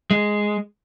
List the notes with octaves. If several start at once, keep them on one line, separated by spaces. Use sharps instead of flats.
G#3